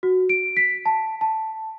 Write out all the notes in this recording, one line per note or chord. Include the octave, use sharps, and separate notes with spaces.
F#4
D7
B6
A5
A5